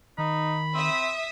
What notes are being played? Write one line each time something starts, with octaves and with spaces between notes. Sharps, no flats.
D#3 D#4 B5
C4 E5 D#6